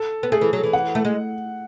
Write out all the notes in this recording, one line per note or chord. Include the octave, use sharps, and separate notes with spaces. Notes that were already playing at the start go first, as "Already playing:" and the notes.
Already playing: A4
B3
A3 G#4
E3
F#3
E3
F#5
A3
G#3